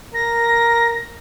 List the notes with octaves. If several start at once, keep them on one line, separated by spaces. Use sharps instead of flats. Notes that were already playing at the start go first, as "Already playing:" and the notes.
A#4 A#6